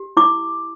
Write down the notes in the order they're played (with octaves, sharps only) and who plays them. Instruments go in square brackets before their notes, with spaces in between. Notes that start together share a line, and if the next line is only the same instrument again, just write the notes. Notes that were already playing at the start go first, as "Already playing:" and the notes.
Already playing: [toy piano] G4
E4 D6